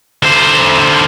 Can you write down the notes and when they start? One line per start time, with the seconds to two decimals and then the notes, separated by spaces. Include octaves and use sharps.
0.23 D3 C5